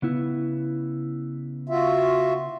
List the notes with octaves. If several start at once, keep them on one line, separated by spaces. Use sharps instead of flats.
C#3 B3 E4
F4 F#4 E5